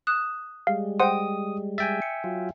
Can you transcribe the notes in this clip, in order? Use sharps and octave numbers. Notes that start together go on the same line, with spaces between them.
D#6 F#6 E7
G3 G#3 F5
C5 D#5 F#5 G5 C6 D#6
E5 G5 G#5 A6
C#7
F#3 F4